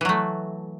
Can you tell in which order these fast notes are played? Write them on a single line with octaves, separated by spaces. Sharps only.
E3 F#3 A3